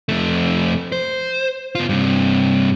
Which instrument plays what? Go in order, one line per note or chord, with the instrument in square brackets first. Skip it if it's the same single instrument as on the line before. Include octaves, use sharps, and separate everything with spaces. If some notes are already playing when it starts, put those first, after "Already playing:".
[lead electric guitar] F2 A3
C5
B3 F4
G2 C3